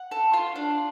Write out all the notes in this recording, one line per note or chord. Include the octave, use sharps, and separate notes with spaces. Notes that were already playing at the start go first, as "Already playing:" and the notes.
Already playing: F#5
A4
F4
D4